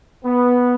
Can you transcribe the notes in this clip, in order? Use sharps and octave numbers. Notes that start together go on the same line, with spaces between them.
B3